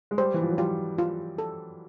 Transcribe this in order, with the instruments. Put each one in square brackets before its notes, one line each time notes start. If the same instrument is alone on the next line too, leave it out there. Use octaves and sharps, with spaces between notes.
[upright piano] G#3
[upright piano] G3 [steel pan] C5
[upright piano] E3
F3
F#3
[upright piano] G3 [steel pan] F4
[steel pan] F4
A4